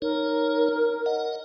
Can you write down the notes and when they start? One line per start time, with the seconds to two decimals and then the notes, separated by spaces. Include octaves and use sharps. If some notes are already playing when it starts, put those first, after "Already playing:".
0.02 D#4 A#4 C#5
1.06 D#5 F#5